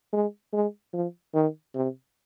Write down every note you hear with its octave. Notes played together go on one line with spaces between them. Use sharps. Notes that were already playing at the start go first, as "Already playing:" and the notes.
G#3
G#3
F3
D#3
C3